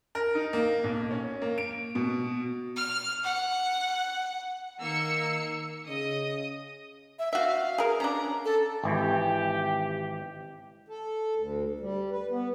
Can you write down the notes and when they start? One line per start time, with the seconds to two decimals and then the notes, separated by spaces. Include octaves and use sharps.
0.15 A#4
0.35 D#4
0.53 A#3
0.84 B1
1.11 C#4
1.42 A#3
1.58 D7
1.95 B2
2.77 F6
3.24 F#5
4.81 D#3 A#3 E6 C#7
5.87 C#3 D#5 D#6
7.19 E5
7.33 F#4 E5 F5
7.78 G#4 A#4
8.00 C#4 D4 A#5
8.45 A4
8.84 G#1 E3 G4
10.87 A4
11.36 D2
11.80 G3
12.10 B4
12.30 B3